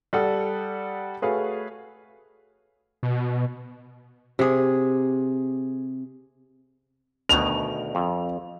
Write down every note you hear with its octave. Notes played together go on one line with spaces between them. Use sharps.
G3 A4 F#5 D#6
A3 F#4 G#4 B4 C#5 F5
B2
C3 G#4
D2 B2 D#3 F7
F2